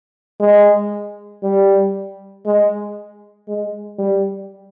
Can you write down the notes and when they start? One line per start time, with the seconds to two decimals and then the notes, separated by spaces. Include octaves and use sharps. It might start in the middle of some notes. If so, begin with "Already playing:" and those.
0.40 G#3
1.43 G3
2.46 G#3
3.48 G#3
3.99 G3